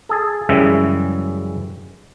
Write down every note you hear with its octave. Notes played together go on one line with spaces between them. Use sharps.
G#4 A4
F#2 C#3 E3 G3 G#3 E5